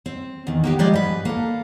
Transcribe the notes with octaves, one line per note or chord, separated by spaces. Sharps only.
C4
E2 D#3
A#3 B3 G4
F3 G3 G#3 G4 D5 D#5
G#2 B4
A#3 A4